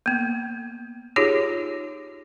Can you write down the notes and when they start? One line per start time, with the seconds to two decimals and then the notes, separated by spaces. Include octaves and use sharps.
0.06 A#3 B3
1.16 D#4 F4 G4 G#4 C#5